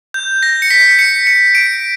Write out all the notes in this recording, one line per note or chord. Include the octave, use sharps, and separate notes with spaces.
G6
A#6
C#7
B6
C#7
C#7
D7